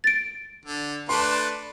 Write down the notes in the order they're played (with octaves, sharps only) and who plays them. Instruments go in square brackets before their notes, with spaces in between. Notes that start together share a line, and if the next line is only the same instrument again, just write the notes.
[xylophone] A6 D7
[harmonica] D3
[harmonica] A3 D4 B4 [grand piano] C6